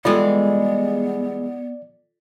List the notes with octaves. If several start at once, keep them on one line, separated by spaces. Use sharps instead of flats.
E3 G3 G#3 B3 F4 A4 D5